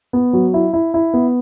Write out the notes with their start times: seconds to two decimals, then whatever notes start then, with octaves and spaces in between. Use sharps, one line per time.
0.13 B3
0.33 F#3
0.54 E4
0.73 E4
0.94 E4
1.14 B3